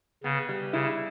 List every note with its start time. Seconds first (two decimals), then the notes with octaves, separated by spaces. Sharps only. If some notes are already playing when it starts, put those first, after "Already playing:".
0.24 C#3 B3
0.49 G3
0.73 C#3 E4